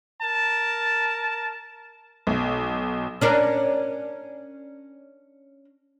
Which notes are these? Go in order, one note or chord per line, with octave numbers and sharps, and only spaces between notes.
A#4 A5
B1
C#4 D4 A#4